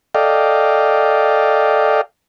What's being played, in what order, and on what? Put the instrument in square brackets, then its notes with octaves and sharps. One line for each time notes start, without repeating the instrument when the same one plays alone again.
[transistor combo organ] A4 D5 D#5 F5 G5